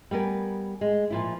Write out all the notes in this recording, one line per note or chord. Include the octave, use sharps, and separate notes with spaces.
G3 B3 A#4 G#5
G#3
A#2 F3 E4